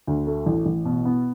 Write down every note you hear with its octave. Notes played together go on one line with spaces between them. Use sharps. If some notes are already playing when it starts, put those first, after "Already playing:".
D2
A3
A1
A1
B2
B3